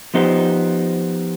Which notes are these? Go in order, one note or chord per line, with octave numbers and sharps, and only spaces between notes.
F3 B3 D#4 G4 C5